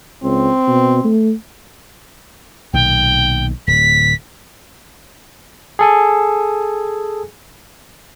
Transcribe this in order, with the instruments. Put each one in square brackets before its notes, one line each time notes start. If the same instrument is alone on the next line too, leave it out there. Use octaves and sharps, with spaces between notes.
[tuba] C#2 [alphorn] C4
[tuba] B2
A3
[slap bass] B1 A#2 D#3 [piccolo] G5
[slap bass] D1 [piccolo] B6
[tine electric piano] G#4 A4 G#5